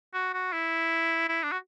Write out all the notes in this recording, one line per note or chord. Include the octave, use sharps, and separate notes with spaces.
F#4
F#4
E4
E4
D4
F#4